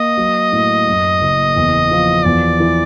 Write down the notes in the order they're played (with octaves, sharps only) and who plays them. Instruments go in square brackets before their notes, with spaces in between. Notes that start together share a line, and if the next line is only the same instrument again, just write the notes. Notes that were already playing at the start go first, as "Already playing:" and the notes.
Already playing: [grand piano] A#3 [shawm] D#5
[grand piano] F#3
A2
F#2
F#1
E2
F3
[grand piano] E2 [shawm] D5
[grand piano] E3